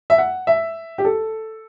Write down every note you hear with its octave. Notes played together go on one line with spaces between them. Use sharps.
E5
F#5
E5
G4
A4